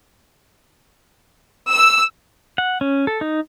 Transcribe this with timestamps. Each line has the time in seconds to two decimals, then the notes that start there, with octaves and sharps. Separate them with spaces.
1.69 E6
2.58 F#5
2.81 C#4
3.07 A4
3.21 D#4